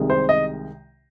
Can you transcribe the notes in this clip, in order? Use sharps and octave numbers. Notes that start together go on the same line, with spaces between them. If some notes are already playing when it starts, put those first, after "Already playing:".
Already playing: C2 C3 D#3 G#3
C5
D#5